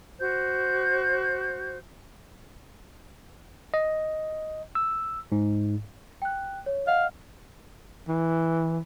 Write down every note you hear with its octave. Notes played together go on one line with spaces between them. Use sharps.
F#4 C5 G6
D#5
E6
G#2
G5 F#6
C#5
D#5 F5 F#5
E3